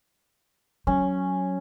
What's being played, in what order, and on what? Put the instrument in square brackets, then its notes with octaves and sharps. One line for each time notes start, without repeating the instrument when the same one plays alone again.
[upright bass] F#3 [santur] C#4